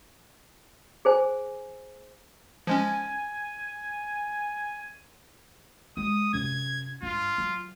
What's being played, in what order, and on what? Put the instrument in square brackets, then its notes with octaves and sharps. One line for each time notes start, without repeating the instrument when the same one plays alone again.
[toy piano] G#4 C5 G#5
[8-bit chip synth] F3 G#3 C#4 [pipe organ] G#5
[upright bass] G#3 [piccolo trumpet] D#6
[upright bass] F#2 C3 [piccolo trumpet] G#6
[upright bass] G2 [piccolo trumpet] F4
[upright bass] F#3